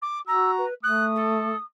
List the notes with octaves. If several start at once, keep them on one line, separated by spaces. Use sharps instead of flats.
D6
F#4 A#5 E6
B4
A3 D#6 F#6
A4